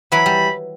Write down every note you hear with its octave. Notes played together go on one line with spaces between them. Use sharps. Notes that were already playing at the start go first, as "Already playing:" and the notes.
E3 F#3 B5
G3